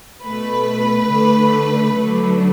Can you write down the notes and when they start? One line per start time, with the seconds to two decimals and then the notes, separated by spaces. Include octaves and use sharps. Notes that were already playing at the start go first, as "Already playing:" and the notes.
0.23 B2 A3 B4
1.08 D3 A3
1.93 D3 F#3 A3